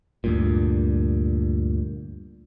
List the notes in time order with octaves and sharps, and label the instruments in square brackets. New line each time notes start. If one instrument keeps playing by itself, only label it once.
[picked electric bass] D2 G2 A#2